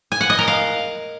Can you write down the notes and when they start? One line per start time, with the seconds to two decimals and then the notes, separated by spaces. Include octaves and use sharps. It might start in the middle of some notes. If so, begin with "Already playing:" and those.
0.12 G#5
0.21 F#5
0.30 D#5
0.39 A#4
0.48 F5